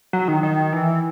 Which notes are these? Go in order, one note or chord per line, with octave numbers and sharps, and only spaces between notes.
F#3
D#3
D#3
E3